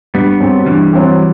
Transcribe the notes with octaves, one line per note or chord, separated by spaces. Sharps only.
G2 G3 B3
F#3 C4 G4
G2 E3 G3
F#3 C4 G4